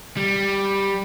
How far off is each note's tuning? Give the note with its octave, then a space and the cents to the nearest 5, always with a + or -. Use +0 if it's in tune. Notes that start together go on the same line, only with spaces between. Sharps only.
G3 +5